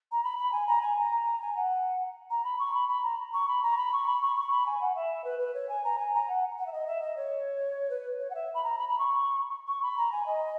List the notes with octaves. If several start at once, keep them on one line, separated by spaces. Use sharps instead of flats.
A#5
B5
B5
G#5
A#5
G#5
A#5
G#5
F#5
A#5
B5
C#6
B5
B5
A#5
C#6
B5
A#5
B5
C#6
B5
C#6
C#6
B5
G#5
F#5
E5
B4
B4
C#5
G#5
A#5
G#5
A#5
F#5
F#5
E5
D#5
E5
D#5
C#5
B4
C#5
F#5
E5
B5
A#5
B5
B5
C#6
C#6
B5
A#5
G#5
D#5